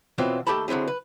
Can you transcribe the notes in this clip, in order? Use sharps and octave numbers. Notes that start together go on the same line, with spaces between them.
B2 E3 F#3 C4 F4
D#2 A3 G4 A4 A5 B5
D3 F#3 C4 E4 G#4
B4